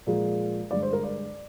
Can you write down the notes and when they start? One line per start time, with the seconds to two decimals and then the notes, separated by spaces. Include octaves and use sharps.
0.07 A#2 F3 G#3 G#4
0.71 G2 D3 G#3 D5
0.83 C5
0.93 A#4
1.03 D5